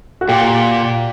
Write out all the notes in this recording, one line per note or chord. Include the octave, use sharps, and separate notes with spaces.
F#4
A#2 G4